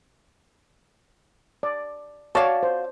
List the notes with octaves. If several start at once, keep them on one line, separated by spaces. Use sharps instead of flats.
D5
F#4 C#5 D5 F5 A5
C5